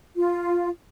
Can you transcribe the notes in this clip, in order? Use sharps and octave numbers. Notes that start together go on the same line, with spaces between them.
F4